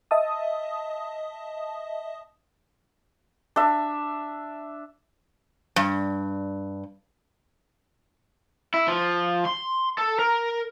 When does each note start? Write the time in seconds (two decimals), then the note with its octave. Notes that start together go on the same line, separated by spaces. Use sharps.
0.11 D#5 E5 A5 D#6
3.56 D4 E5
5.76 G2
8.74 E4
8.88 F3
9.45 C6
9.98 A4
10.19 A#4